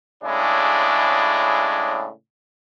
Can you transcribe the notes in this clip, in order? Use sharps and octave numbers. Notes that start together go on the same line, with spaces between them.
A2 C#3 G#3 D4 E4